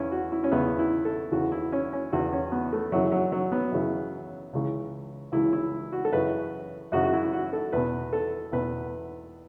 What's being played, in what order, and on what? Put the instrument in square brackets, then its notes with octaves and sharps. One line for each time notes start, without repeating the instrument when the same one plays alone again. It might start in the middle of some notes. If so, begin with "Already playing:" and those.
Already playing: [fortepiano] E2 C#3 E3 C#4 E4
F#4
E4
C#4
E2 C#3 E3 B3
E4
A4
E2 C#3 E3 F#4
E4
C#4
C#4
E2 C#3 E3 F#4
C#4
B3
A3
F#2 C#3 E3 F#3
F#3
F#3
B3
F#2 C#3 E3
C#2 C#3 E3
C#2 C#3 E3 E4
E4
F#4
A4
F#2 C#3 E3 B4
F#2 C#3 E3 F#4
F#4
E4
F#4
A4
E2 B2 B4
A4
E2 B2 B4